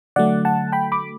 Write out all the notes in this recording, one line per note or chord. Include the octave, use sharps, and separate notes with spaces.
D3 F#3 A3 D5 F#5
F#5 A5
G5 B5
B5 D6